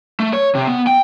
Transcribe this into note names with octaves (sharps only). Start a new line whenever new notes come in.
A3
C#5
C3
B3
G5